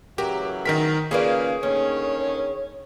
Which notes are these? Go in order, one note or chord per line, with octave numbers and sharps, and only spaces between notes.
C#3 E3 F#3 G4 A#4
D#3 C4 D#4 A#4 B6
A#2 C#3 A#3 C#4 G#4 B4 D5
D#2 D3 D#3 C#4 C#5